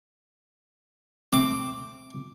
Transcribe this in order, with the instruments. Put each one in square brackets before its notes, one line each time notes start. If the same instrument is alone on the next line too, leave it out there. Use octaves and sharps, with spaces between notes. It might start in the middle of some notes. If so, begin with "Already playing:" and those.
[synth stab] A3 C4 [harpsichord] D6